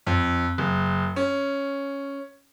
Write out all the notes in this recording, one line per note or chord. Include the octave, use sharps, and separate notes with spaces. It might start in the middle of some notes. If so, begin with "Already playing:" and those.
F2
F#1
C#4